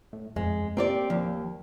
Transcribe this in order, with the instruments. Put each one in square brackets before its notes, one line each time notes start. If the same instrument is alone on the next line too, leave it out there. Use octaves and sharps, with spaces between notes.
[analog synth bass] A2
[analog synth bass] F2 [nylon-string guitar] G#3
[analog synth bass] A#3 [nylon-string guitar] C4 G4 D5
[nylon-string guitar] D#2 [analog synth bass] F3